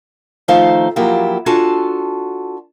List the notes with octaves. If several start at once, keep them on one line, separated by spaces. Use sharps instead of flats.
D#3 F3 A3 D#4 C5 F5
F3 F#3 A#3 E4 F4 G4
D4 F4 F#4 A4 G#5 A5